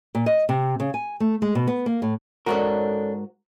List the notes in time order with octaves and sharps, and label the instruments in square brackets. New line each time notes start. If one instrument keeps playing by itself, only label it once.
[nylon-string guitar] A#2
D#5
C3
C#3
G#5
A3
G#3
B2
B3
A#3
A2
[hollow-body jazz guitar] G#2 F#4 A#4 [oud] C#4 D4 A4